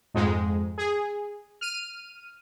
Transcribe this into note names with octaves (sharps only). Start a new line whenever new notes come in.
F2 G#2 G#3
G#4
F6 D#7